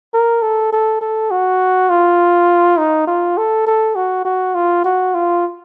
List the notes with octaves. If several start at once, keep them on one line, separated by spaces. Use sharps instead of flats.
A#4
A4
A4
A4
F#4
F4
D#4
F4
A4
A4
F#4
F#4
F4
F#4
F4